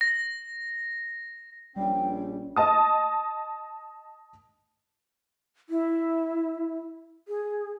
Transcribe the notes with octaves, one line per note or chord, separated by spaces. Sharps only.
A#6
A#1 G3 C#4 G5
D#5 A5 D#6
E4
G#4